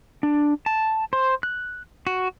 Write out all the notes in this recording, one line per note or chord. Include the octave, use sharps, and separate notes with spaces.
D4
A5
C5
F#6
F#4